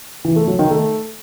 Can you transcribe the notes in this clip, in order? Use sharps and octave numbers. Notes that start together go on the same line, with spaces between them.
E3
A3
F#3
D#3
A3